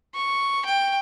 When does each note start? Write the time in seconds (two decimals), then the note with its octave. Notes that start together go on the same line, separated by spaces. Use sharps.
0.15 C#6
0.66 G5